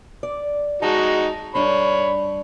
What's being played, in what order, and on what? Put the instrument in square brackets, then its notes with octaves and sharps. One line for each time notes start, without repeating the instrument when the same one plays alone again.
[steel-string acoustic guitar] D5
[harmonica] G#3 D#4 F#4 [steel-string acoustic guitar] A5
[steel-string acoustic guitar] G2 D4 [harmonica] C#5 B5